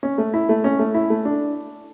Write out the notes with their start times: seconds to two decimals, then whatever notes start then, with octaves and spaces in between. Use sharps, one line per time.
0.03 C#4
0.18 A3
0.34 E4
0.49 A3
0.64 C#4
0.79 A3
0.94 E4
1.10 A3
1.25 D4